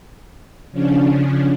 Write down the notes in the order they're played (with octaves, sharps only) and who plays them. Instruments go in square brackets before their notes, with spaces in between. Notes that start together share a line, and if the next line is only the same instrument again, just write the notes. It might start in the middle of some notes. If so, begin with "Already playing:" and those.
[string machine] C#3 F3 C#4 D4